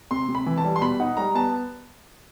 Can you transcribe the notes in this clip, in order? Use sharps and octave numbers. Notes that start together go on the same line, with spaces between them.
C3 C6
C3
B5
E3
A5
G3
C6
B2 B5
D#4 F#5
G3 A#5
B3 A5